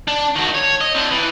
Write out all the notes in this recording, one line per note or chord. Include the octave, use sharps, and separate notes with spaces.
D4
D#3 F#4
C#5
D#5
C4 D4
E3